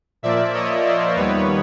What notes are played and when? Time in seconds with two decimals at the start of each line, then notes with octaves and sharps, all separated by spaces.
0.23 A#2 F3 A#3 D5 E5
0.53 C#5 D#5
0.85 C5 D5
1.16 D#2 D#3 G3 B3 B4 C#5